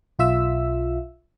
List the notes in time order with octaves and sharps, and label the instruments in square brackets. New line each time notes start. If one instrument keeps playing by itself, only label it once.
[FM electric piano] B1 F4 E5 E6